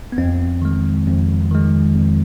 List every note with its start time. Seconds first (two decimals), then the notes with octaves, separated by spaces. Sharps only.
0.12 B3
0.18 F2 C4
0.62 D#3 G#3
1.07 F2
1.51 D#3 G#3
1.96 F2